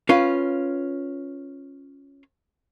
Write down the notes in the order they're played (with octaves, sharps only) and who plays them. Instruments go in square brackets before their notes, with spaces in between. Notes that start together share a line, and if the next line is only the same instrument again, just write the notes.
[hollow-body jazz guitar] C#4 F4 B4 F5